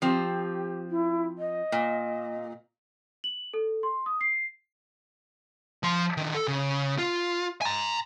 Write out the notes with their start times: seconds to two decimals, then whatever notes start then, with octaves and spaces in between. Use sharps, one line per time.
0.02 F3 C4 G4
0.90 E4
1.38 D#5
1.72 A#2
3.24 F#7
3.54 A4
3.83 C6
4.06 D#6
4.21 C7
5.83 F3 C6
6.17 D#3 D4
6.35 A4
6.47 C#3
6.99 F4
7.61 G#5 A#5